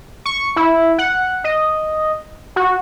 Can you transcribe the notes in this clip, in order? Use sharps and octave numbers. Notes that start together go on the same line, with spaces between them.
C#6
E4
F#5
D#5
F#4